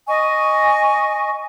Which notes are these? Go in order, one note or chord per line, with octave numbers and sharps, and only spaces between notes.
D#5 G#5 C#6